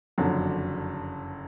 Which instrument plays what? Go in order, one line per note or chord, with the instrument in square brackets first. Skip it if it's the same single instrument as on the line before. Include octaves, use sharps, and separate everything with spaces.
[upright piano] F#1 F2 D3 F#3